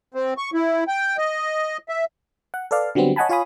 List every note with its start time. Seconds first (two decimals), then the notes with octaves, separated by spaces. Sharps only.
0.14 C4
0.38 C#6
0.54 E4
0.88 G5
1.18 D#5
1.89 E5
2.54 F#5
2.71 A4 B4 D5 F5
2.95 D3 F#3 G3 B3 C4
3.16 C#5 D#5 F#5 G#5 A5 B5
3.29 F4 C#5 F5 G#5 B5 D#6